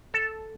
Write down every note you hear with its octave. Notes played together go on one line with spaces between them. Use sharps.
A4